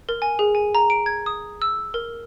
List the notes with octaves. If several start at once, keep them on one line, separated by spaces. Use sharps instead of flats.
A#4
G#5
G#4
G#5
A#5
D7
G#6
D#6
E6
A#4